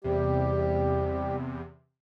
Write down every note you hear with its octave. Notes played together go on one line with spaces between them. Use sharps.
E2 C3 G3 G4